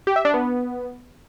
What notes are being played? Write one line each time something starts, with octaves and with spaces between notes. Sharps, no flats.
G4
E5
D4
B3